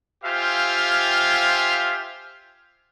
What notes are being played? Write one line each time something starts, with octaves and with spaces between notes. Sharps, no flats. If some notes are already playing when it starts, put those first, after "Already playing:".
F4 G4 C5 E5 F5 G#5